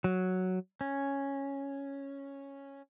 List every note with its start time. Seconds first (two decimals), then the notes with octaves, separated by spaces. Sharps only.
0.04 F#3
0.81 C#4